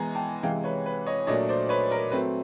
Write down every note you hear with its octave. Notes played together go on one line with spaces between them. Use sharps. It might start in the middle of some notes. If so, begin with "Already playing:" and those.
Already playing: E3 G#3 B3 G#5 A#5
G5 A5
C3 E3 G#3 F5 G5
B4 C#5
B4
C#5 D#5
A#2 F#3 A3 D4 C#5 D#5
C5 D5
B4 C#5
A#4
F#3 A3 C4 B4